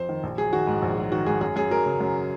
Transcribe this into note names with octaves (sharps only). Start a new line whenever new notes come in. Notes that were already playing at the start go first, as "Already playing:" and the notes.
Already playing: F2 C5
D#3
A#1
F#3 G#4
D#3 F#4
G#2
A#1
F#3
D#3 F#4
G#2 G#4
F#2 G#4
F#2 G#4
F#3 A#4
C#3
F#2